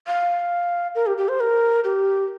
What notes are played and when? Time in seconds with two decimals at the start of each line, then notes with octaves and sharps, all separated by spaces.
0.07 F5
0.95 A#4
1.07 G4
1.18 G4
1.29 C5
1.40 A#4
1.84 G4